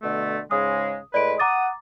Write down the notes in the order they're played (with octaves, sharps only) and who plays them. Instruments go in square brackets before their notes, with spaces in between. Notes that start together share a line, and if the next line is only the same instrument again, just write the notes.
[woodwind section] B2 D3 A3
[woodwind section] G#2 C#3 G#3 [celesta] D#6
[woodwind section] A2 G#3 B4 [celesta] D5 D7
[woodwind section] F#5 D#6 [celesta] A#5 D6 A6